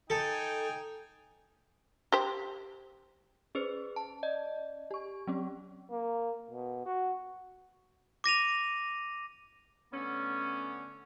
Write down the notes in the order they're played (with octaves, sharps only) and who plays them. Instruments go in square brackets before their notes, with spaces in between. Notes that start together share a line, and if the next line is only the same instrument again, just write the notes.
[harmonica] D#4 G5 G#5 [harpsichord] A4
[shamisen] G4 C5
[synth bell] C#4 [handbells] G#4 B4 C5
[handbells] A5
D5 D#5
[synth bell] G4 C#6
F#3 C4 C#4
[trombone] A#3
B2
F#4
[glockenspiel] D6 A#6 D#7 F7
[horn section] D3 A3 B3 C#4